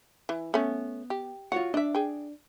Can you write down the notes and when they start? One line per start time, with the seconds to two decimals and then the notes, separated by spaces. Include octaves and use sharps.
0.29 E3
0.54 A3 B3 C#4
1.10 G4
1.52 F4 F#4 C#5 F#5
1.74 D4 D#5 E5
1.95 G#4 G5